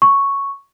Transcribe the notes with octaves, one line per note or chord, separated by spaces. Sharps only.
C#6